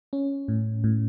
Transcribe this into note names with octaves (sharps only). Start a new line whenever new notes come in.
C#4
A2
A2